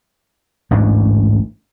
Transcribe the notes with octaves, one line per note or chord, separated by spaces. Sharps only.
A1 D2 G#2 D4